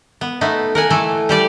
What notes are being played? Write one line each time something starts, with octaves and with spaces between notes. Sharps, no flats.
B3
A3 B3 D#4
A#4 F#5 G#5
E3 A3 A4
G3 G4 D5